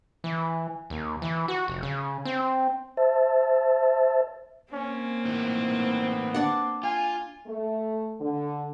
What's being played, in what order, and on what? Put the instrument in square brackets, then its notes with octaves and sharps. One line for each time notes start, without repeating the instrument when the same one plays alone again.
[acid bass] E3
D#2
E3
F#4
F1
C#3
C4
[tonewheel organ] C5 E5 A5
[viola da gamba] A#3 C4 [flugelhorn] C#4
[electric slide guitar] A2 D#3 E3 [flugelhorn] B3
[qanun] D4 D5 F#5
[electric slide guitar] F4 [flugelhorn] G#5
[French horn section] A3
D3